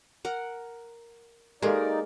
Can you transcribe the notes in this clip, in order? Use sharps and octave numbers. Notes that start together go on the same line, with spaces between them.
A#4 F#5
G#3 A#3 D#4 G4 A4 A#4 D5 F5